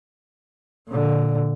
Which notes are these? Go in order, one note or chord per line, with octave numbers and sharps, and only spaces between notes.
A#2 D3